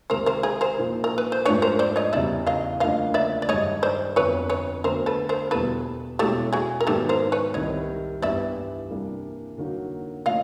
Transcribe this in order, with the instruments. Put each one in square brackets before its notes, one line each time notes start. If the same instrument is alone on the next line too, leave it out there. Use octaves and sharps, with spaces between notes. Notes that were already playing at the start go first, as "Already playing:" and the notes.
[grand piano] C#2 C3 D#3 [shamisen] A#4 C5
[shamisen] A#4 C5
G#4 A#4
A#4 C5
[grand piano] A#2 F3 A#3 D#4
[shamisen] A#4
B4
C5
[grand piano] G#2 F3 A3 D4 [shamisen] B4 C#5
[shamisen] A#4 C5
C5 D5
C#5 D#5
[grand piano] E2 C#3 E3 G3 [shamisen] D5 E5
[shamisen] D#5 F5
[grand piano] D2 C#3 F3 A#3 D4 [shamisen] D#5 F5
[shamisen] D5 E5
D5
[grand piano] G2 D#3 G#3 [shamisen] C#5 D#5
[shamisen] C5 D5
[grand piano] F2 D3 F#3 B3 [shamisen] B4 C#5
[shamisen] B4 C#5
[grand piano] D2 D3 F#3 B3 [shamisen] A#4 C5
[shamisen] A4 B4
A#4 C5
[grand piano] E2 B2 G3 [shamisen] A4 B4
[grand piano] B2 G#3 C#4 E4 [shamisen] G4 A4
[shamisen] F#4 G#4
A#4
[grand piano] G#2 D#3 F#3 B3 D#4 [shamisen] G4 A4
[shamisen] A#4 C5
B4 C#5
[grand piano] C2 C3 D#3 [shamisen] C#5 D#5
[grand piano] G2 E3 G3 B3 [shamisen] D5 E5
[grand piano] C3 E3 G3 A#3 D4
D3 F#3 A#3 D#4 F#4
[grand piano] A#2 F3 A3 C#4 [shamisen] D#5 F5